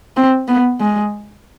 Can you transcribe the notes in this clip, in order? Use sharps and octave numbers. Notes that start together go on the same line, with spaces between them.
C4
B3
G#3